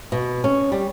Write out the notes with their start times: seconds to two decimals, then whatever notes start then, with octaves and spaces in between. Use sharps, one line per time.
0.12 B2
0.44 C#4
0.72 G3